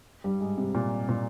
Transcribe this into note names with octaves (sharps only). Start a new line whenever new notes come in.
G2 G3
G#2 G#3
C3
A#2
A#2